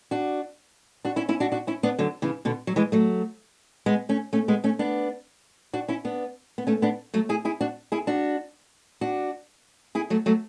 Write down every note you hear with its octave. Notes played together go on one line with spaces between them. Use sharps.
D4 F#4
D4 F#4
C#4 E4
C#4 E4
D4 F#4
D4 F#4
C#4 E4
B3 D4
D3 F#3
C#3 E3
B2 D3
F#3
E3 G#3
F#3 A3
G#3 B3
A3 C#4
A3 C#4
G#3 B3
A3 C#4
B3 D4
D4 F#4
C#4 E4
B3 D4
B3
A3 C#4
B3 D4
F#3 A3
E4 G#4
E4 G#4
D4 F#4
E4 G#4
D4 F#4
D4 F#4
E4 G#4
F#3 A3
F#3 A3